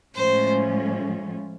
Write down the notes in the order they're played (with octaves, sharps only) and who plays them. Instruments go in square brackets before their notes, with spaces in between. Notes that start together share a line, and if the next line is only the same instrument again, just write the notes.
[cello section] A2 F3 G#3 C#4 [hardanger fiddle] C5